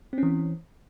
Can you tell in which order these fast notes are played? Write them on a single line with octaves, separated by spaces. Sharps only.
C4 C#4 E3